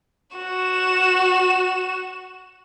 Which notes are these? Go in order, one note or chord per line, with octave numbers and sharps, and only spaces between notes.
F#4 E7